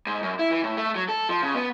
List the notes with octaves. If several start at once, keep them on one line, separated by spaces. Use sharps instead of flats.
G#2
F#2
E4
E3
A2
A3
F#3
A4
F3
C#3
B3